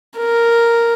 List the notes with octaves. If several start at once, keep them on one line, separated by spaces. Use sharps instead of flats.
A#4